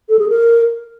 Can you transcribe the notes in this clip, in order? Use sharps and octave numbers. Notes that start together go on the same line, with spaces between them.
A4
G#4
A#4